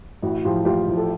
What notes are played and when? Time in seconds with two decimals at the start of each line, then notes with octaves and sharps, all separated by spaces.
0.22 A1 E4 F#4
0.45 A2 F3 F4 G4
0.65 A1 F4 G4
0.87 A2 F3
0.97 A4